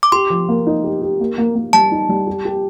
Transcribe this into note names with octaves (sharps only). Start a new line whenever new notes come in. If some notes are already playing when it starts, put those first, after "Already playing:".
D6
G4 C6
F3
A#3
D#4
G4
G4
A#3
A#3
A#3
G3 A5
D#4
G3
G4
G4